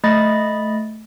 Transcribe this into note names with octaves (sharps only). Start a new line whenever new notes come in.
A3 D#5 B5 A6